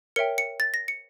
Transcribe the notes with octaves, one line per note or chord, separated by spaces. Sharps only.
A#4 C#5 E5 G5 C#7
C#7
A6
A#6
C#7